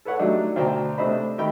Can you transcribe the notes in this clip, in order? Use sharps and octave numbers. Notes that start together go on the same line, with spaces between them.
A4 B4 C#5 F#5
F#3 G3 A3 D4 D#4
D2 B2 C5 D5 G5 A#5
C3 A3 D4 C5 D#5 B5
D#3 A3 G4 G5 B5